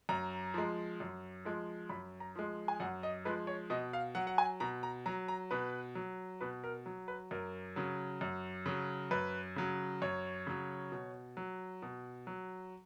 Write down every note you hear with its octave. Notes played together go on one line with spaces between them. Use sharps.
F#2 A#5
F3 G#3
F#2
F3 G#3
F#2 B5
A#5
F3 G#3
G#5
F#2 F#5
D#5
F3 G#3 B4
C#5
B2 D#5
F5
F#3 F#5
F#5
G#5
B2 A#5
A#5
F#3 A#5
A#5
B2 B4
F#3
B2 B4
A#4
F#3
B4
F#2 A#4
C#3 F#3
F#2
C#3 F#3
F#2 B4
C#3 F#3
F#2 C#5
C#3 F#3
B2
F#3
B2
F#3